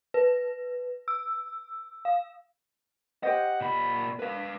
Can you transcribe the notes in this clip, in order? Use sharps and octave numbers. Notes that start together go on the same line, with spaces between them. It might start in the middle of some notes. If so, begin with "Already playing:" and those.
B4
E6
F5
G4 C5 D#5 F#5
A#2 B5
B4 F5